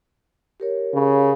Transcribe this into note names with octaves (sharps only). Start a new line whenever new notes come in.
G4 A#4 C#5
C#3